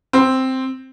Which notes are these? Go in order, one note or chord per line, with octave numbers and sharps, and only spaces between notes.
C4